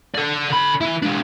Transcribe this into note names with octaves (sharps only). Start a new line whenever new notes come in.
A4 D5
D3 B5
E3 E4
G#3 D4